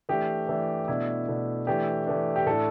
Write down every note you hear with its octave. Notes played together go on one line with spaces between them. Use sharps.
E3 A3 D4 G4
E3 A3 D4
B2 A3 D4 E4
B2 A3 D4
E3 A3 D4 G4
E3 A3 D4
G4
A2 A3 D4 A4